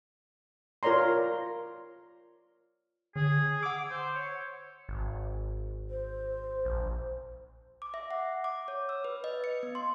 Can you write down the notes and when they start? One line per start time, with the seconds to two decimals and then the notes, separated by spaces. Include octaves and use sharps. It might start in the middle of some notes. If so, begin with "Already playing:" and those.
0.83 F4 A#4 C#5 D5 A#5 C6
3.16 D3 G#4
3.63 F#5 D6 E6
3.91 C5
4.15 C#5
4.89 G#1
5.90 C5
6.65 A#1
7.82 D6
7.94 E5
8.11 F#5
8.44 D6
8.68 C#5
8.89 E6
9.04 B4
9.24 D#5
9.44 C#7
9.63 B3
9.75 C6